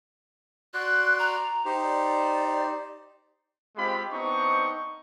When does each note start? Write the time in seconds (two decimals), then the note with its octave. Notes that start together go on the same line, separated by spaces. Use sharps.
0.74 F#4 D5 C6 F#6
1.19 A#5
1.65 D#4 G4 C5
1.82 D5
3.76 G#3 C4 F4 G4 F5 B5
4.11 B3 C4 D4 D#4 C#6